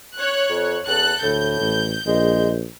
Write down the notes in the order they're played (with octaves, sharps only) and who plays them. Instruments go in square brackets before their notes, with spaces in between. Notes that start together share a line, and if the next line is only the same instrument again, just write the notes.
[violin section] C#5 F#6
[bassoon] F2
[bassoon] E2 [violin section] A4 F#6
[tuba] D2 [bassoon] A2 [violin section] G6
[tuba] A1
[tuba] A#1 [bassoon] G#3